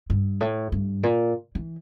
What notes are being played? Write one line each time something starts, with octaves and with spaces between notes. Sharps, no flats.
G2
A2
G2
A#2
E3